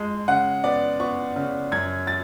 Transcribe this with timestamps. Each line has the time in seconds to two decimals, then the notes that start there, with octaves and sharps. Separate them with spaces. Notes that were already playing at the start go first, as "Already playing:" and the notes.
Already playing: F2 G#3
0.28 C#3 F#5
0.64 B3 D5
1.00 B3 C#6
1.36 C#3
1.72 F#2 G#6
2.07 A6